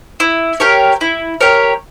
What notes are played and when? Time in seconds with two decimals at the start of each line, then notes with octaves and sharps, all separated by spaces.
0.20 E4
0.60 G4 A#4 C#5
1.01 E4
1.41 G4 A#4 C#5